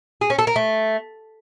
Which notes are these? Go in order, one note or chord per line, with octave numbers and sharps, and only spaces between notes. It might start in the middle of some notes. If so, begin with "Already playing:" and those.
G#4
C#4
A4
A#4
A3